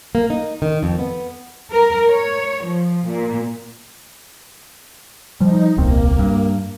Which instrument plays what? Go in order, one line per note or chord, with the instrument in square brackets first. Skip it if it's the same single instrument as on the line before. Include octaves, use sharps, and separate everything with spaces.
[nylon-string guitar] A#3
D#4
D#3
F2
B3
[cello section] A#4
C#5
F3
A#2
[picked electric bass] F3 G3 [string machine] D#4
[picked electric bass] D#1 C2 C4 [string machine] A#3
[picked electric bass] G2